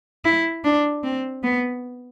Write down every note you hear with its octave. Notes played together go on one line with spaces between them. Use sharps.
E4
D4
C4
B3